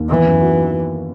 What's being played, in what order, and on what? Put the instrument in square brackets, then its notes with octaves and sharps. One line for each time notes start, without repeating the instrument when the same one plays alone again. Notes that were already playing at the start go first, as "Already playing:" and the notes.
Already playing: [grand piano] D#2
[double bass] E3 [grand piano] B3
[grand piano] F#2
F#4